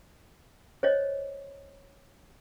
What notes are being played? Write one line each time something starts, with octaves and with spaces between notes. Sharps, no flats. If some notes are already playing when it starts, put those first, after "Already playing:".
C5 C#5 D#5